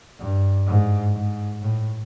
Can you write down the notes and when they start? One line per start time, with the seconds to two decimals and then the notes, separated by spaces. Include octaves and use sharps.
0.19 G2
0.67 G#2
1.13 G#2
1.61 A2